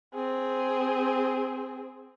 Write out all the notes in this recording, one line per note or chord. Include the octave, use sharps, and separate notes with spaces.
C4 G#4